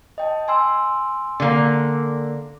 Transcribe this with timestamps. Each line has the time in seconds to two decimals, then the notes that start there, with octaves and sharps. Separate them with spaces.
0.18 D#5 G5 A5
0.48 G#5 C6 E6
1.40 D3 A#3